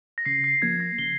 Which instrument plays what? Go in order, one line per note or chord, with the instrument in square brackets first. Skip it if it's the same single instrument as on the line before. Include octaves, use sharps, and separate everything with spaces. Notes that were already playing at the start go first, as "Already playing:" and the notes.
[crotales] A#6
[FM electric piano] C#3 [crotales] C7
[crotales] C7
[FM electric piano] F3 A#3 [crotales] G#6
[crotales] A#6
[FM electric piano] C#3 [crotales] G7